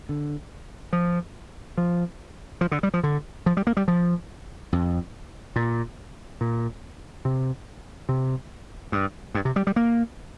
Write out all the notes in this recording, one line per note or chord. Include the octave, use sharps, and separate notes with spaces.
D3
F3
F3
F3
D3
G3
F3
D3
F3
G3
A#3
G3
F3
F2
A#2
A#2
C3
C3
G2
G2
C3
G3
G3
A#3